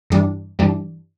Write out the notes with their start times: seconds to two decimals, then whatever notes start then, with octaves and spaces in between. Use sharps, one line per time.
0.10 G2 E3 G3 D4
0.59 G2 E3 G3 D4